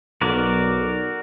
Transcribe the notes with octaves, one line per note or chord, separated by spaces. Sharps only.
B1 F#4 A#4 D5